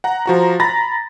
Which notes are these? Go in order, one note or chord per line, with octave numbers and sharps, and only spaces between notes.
F#5 A#5
F3 F#4 A#5
A#5 B5 A6 A#6